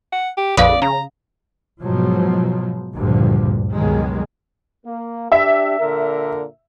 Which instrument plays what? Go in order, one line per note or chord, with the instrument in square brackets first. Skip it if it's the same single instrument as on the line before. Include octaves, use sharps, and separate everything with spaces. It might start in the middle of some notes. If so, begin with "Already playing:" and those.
[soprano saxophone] F#5
G4
[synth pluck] A#1 F2 B4 [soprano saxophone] D5 [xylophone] F5 D#6
[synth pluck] C#3 [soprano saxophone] A#5
[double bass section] G#2 B2 F3 F#3
F#1 D2 G2 A#2 D3 F3
C#2 G2 B2 D#3 F#3 G#3
[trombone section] A#3
[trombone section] D4 G4 [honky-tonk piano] E5
[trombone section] A#2 D3 A#4